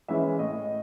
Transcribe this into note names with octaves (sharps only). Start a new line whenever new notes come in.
E3 G#3 C#4 E5
A2 D#5